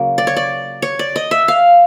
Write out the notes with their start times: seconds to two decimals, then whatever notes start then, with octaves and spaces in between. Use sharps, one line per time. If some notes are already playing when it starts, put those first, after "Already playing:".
Already playing: C#3 F#3 A#3
0.18 D5
0.27 C#5
0.36 D5
0.82 C#5
0.99 D5
1.16 D#5
1.31 E5
1.48 F5